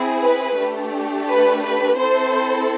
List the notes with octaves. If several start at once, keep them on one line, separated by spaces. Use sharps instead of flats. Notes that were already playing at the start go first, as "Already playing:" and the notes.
Already playing: C4 E4 G#4
B4
A3 D4 G4
B4
B4
C4 E4 A4 C5